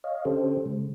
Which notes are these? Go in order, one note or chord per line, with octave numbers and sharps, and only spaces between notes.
C#5 D#5 F5
D3 C#4 G4 A4 C5
C#3 G#3